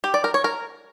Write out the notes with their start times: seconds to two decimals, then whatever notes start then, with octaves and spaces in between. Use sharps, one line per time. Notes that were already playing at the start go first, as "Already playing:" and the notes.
0.04 G4
0.14 D5
0.24 A#4
0.34 C#5
0.44 A#4